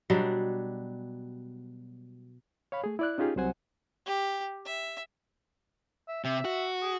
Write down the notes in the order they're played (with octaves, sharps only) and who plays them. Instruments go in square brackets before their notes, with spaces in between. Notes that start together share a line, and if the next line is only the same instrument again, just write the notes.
[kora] B2 F#3 G3 D4
[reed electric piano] C#5 F5 B5
A3 G#4
E4 D5 F#6
C#4 D#4 F4 G4 G#4
C2 C3 F#3 C5 F#5 G#5
[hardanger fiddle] G4
E5
[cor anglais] E5
[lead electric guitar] C3 [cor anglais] E5
[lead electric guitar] F#4
[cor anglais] G#4